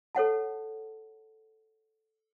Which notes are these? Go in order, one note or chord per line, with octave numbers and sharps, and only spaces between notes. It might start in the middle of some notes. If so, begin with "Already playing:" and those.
A4 C#5 F#5 A5